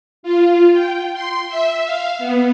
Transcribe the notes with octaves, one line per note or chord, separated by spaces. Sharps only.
F4
G5
C6
E5
F5
B3